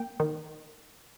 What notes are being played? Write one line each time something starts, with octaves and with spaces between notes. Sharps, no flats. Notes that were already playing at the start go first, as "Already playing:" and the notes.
Already playing: A#3 G5
D#3